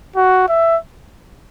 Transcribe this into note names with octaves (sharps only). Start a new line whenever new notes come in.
F#4
E5